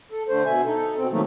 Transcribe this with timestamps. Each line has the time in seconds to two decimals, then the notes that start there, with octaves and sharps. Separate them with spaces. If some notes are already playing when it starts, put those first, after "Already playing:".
0.11 A4
0.29 D3 A3 C5
0.45 B2 E5 G#5
0.65 D#4 A4
0.97 B2 C4
1.12 D#3 F3 F#3 A3 A#3 D#4